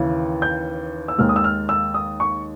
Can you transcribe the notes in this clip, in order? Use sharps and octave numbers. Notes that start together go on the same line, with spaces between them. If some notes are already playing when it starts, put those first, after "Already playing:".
Already playing: D#2 C#3 E3
G6
E6
D#2 D#3 G#3 F6
D#6
E6
F6
E6
D#6
C#6